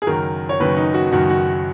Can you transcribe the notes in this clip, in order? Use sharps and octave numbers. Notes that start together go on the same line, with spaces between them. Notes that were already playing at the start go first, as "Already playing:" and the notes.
G#4
F#1 F#2 D#3 F#3 A#4
C#5
F#1 F#2 D#3 F#3 B4
D#4
F#4
F#1 F#2 D#3 F#3 F#4
F#4